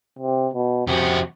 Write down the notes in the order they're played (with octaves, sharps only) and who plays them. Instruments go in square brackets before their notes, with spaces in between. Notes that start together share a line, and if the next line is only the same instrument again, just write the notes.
[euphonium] C3
B2
[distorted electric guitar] F2 F#4 [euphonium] C3